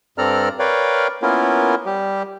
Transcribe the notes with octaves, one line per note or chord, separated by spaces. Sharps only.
G2 C4 A4 D5 A#5 F6
A#4 B4 C#5 D5 F5 G5
A#3 B3 C#4 E4 F4 A#4
G3 G4